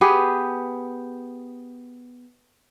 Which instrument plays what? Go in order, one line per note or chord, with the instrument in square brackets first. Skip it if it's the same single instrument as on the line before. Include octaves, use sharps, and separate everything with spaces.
[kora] B3 G4 G#4